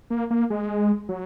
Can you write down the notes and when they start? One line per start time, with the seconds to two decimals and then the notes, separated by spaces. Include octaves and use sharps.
0.10 A#3
0.31 A#3
0.50 G#3
1.09 F#3